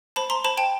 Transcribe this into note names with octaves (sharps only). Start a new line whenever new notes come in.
C5 A5 B5
A#5 C6
C5 A5 B5
G5 A5